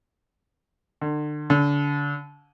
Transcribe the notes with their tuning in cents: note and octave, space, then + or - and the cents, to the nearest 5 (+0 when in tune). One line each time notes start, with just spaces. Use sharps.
D3 +35
D3 -30